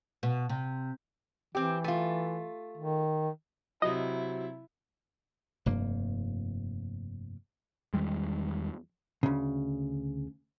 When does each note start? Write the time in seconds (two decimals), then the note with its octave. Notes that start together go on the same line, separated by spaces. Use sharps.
0.23 B2
0.49 C3
1.55 E3 C4 G4
1.84 A3 F4
2.78 D#3
3.82 C3 F#3 E4 D#5
5.66 F1 G2 A#3
7.94 E2 D#3 G3 G#3
9.23 D2 C#3